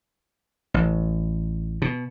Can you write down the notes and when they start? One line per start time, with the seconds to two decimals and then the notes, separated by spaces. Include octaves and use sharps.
0.74 A1
1.82 B2